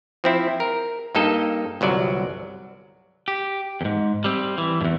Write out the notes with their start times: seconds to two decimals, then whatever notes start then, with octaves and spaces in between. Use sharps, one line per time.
0.24 F3 C4 E4
0.60 A#4
1.15 G2 A#3 D#4 A4 D#5
1.81 G1 C2 F#3 D5
3.28 G4
3.81 E2 G#2
4.24 G3 C4
4.58 E3
4.81 E2 G2